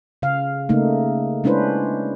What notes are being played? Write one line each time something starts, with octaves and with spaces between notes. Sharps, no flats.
C#3 F5
C#3 A3 A#3 D#4
G#3 C#4 D4 E4 B4 C5